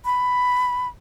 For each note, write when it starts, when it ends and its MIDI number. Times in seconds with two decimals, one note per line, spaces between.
0.05 0.88 83